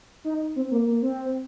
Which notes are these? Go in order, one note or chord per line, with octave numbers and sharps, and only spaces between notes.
D#4
C4
A#3
A#3
C4